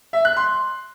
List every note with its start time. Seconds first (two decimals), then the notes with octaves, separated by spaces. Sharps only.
0.13 E5
0.25 F#6
0.37 C6